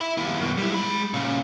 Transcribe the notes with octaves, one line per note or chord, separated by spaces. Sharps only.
E5 B5
D#2 E4
F#2 B2
G3 E4
G#3 B5
A#2 C#3